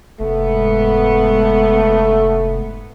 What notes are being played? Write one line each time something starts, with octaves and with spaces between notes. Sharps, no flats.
F1 G#2 A3 B3